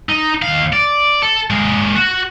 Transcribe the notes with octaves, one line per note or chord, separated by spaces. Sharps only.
D#4
D#2 F5
D5
A4
G#3 A#3
F#4